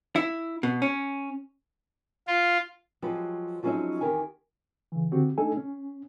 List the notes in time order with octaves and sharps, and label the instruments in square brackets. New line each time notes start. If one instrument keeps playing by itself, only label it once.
[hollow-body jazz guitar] E4
B2
C#4
[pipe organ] F4
[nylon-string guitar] F3 F#3 G#3 G4 B4
F3 F#3 G#3 C#4 D#4 E5
E2 D#3 G4 A#4 G#5
[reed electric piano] C#3 E3
D3 C4 F#4 G4
G#3 A3 D4 D#4 A4 G#5
C#4